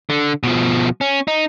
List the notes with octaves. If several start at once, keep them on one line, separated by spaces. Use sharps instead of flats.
D3
B2 F3
C#4
D#4